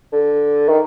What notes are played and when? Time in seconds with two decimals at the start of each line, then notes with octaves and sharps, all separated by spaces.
0.13 D3
0.69 D#3